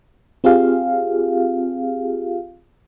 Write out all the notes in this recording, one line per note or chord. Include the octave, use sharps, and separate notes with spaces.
C4 F4 G4 G#4 F5